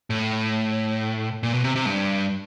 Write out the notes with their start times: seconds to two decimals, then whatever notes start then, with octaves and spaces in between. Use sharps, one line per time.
0.10 A2
1.43 A#2
1.54 B2
1.64 C3
1.76 C3
1.86 G2